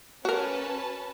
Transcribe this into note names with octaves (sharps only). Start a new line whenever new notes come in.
C#4 F#4 A#4 B4 A5